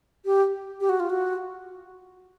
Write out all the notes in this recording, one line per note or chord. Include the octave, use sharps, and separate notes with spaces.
G4
G4
F#4
F4
F#4